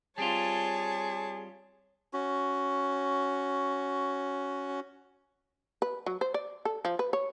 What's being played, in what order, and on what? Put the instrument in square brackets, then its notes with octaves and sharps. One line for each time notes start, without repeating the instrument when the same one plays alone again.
[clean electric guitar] G3 C4 F4 [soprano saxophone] G#4 [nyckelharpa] C#5 A5
[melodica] C#4 F#4
[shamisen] B4
F#3
C5
D5
A4
F3
B4
C#5